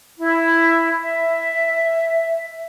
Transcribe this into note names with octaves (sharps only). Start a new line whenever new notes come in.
E4
E5